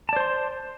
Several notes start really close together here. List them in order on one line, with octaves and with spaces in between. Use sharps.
A5 D5 C5 C6